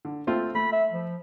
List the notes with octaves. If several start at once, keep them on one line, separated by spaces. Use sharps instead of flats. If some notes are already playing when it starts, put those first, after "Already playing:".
D3
A3 C4 F4
A3 B5
E5
F3